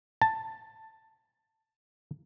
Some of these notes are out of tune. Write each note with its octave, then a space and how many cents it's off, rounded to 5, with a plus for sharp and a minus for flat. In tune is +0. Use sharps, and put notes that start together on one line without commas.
A5 +10